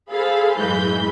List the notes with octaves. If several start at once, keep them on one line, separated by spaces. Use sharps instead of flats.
G#4 A4 C5 F5 B5
F#2 A2 E3 G#3 B5 G6